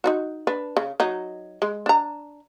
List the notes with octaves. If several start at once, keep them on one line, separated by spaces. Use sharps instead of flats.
D#4 F4 F#4
D4 B4
C#3
F#3 D#4
G#3
D4 A#5